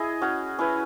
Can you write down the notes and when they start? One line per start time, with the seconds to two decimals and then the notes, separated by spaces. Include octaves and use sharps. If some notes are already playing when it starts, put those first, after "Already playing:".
Already playing: E4 G#4 D#5
0.21 C#4 F#4 C#5
0.59 C#4 E4 B4